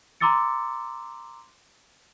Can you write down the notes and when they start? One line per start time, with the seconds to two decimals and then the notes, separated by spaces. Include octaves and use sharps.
0.20 A#5 C6 D6 E6 A6 C#7